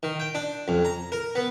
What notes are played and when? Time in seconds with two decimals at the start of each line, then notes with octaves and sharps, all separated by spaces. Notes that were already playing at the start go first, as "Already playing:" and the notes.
0.03 D#3
0.20 G5
0.35 D4
0.68 F2
0.85 A#5
1.12 A#4
1.35 B3